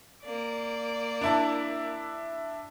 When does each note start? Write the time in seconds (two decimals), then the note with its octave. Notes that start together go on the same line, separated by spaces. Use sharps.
0.23 A#3 D5
1.21 D4 E4 A5